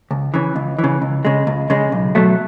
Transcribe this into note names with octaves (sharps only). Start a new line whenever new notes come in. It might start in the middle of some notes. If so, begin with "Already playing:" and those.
C#2
C#3 E3
C#2
E3
C#3
C#2
C#3 G#3
C#2
C#3 G#3
B1
B2 F#3 A3